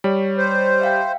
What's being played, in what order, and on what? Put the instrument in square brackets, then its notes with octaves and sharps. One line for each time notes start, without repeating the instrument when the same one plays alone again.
[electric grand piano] G3 [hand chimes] C#5
[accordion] C5
[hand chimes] E5 F5 G5